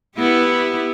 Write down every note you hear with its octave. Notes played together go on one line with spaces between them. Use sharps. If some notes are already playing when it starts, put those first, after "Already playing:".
B3 E4 G4